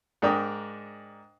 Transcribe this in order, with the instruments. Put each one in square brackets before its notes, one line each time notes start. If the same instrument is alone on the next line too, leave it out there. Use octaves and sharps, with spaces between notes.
[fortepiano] G#2 D4 A#4 G5 D#6